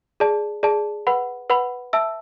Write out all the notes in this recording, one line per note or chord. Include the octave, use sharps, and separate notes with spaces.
G#4 D5 A5
G#4 D5 A5
B4 F#5 B5
B4 F#5 B5
E5 A5 E6